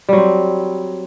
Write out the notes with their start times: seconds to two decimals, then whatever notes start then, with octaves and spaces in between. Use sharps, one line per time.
0.09 G3
0.13 F#3
0.17 C4